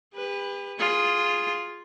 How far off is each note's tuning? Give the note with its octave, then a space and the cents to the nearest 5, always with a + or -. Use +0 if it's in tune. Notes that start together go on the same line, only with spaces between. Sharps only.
G4 +40 B4 +0
F4 +0 G#4 +0